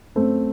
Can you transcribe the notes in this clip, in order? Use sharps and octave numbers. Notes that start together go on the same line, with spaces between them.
F#2 A3 C4